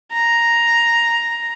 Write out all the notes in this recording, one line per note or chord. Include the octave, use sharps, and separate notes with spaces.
A#5